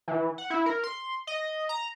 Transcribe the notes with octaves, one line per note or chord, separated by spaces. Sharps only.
E3
F#5
E4
A#4
C6
D#5
A#5